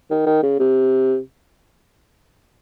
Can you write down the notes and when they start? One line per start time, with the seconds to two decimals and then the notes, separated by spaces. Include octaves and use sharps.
0.10 D#3
0.26 D#3
0.43 C#3
0.59 C3